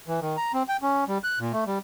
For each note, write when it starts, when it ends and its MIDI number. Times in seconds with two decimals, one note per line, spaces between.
0.08 0.20 52
0.21 0.37 51
0.37 0.52 82
0.53 0.63 60
0.68 0.77 79
0.82 1.04 61
1.08 1.18 55
1.24 1.39 90
1.39 1.52 46
1.52 1.64 57
1.66 1.79 55